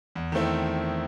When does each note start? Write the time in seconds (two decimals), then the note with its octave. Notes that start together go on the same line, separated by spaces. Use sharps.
0.15 E2
0.32 D#3 A3 C4 E4